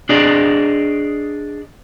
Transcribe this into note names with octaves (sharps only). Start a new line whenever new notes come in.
D4 G#4 D5 D#5